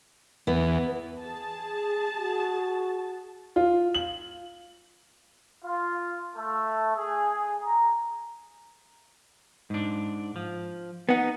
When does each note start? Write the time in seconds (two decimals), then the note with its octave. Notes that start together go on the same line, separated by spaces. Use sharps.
0.47 E2 B3
1.20 G#4 A5
2.17 F#4
3.56 F4
3.95 F#7
5.64 F4
6.36 A3
6.95 G#4
7.64 A#5
9.70 G#2 D4
10.36 F3
11.09 B3 D#4 F#5